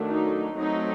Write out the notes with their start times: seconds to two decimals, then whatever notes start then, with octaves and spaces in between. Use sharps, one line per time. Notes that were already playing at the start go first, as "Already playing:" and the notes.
Already playing: D#3 F#3 A3 D4
0.08 D#4
0.58 F#3 A3 C4 D#4